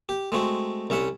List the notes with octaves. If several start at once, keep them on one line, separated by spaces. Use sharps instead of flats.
G4
G#3 A3 C4 F#4
C2 C#4 E5 F#5